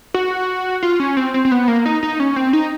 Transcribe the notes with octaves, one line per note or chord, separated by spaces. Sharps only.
F#4
F4
C#4
C4
C4
C4
B3
A#3
D#4
D#4
C#4
C4
D#4